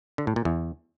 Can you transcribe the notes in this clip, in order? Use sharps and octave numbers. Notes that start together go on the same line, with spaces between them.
D3
A2
A#2
E2